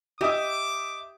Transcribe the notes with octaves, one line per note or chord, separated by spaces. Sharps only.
G4 D#5 E5 D6 D#6